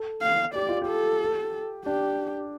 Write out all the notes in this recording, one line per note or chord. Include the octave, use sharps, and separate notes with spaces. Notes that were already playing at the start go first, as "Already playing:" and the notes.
Already playing: A4
F5
G4 D5
F4
G4
A4
D4 G4